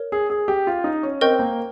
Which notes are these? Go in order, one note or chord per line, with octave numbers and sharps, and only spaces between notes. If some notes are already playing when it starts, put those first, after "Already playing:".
Already playing: A#4 C#5
G#4
G#4
G4
F4
D#4
C#4
C4 A#4 D#5 G5 C#6 G6
A#3